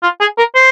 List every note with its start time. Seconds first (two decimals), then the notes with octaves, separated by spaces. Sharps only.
0.03 F4
0.20 G#4
0.38 A#4
0.55 C5